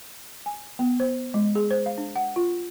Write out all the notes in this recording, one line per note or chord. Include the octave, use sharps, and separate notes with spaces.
G#5
B3
C5
G#3
G#4
C5
F5
D4
F#5
F4